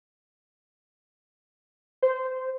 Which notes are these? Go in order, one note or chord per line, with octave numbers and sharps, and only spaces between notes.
C5